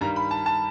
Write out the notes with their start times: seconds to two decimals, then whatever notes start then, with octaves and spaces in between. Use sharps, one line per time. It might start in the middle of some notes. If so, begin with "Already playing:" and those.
0.01 G2 D#3 G3 A#5
0.16 B5
0.31 A5
0.46 A5